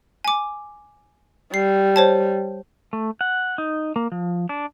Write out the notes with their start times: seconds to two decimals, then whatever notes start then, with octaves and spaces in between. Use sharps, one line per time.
0.25 G#5 D6
1.54 G3 C7
1.96 C5 C#5 A5
2.93 A3
3.21 F#5
3.58 D#4
3.96 A#3
4.12 F3
4.49 D4